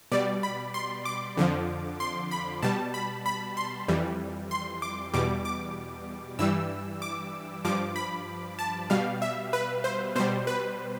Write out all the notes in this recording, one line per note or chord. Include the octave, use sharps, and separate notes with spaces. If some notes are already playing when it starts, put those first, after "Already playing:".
B2 G3 D5
B5
C6
D6
F2 D3 F3
C6
B5
B2 G3 A5
B5
B5
C6
F2 E3 G3
C6
D6
E2 B2 G3 D6
D6
G2 E3 G3 E6
D6
G2 F3 D6
B5
A5
B2 G3 F5
E5
B4
C5
B2 G3 C5
B4